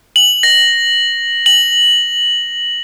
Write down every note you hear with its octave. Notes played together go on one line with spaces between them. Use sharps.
F#7
A#6
F#7